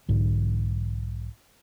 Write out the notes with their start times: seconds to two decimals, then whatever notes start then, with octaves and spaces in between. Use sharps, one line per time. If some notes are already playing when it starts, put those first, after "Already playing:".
0.08 B1 G#2 D3 E3